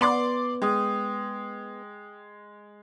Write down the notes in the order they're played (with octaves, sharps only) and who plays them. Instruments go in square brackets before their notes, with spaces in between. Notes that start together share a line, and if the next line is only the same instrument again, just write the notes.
[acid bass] B3 [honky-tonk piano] D5 C6 D6
[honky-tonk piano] G#3 [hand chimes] G5 D#6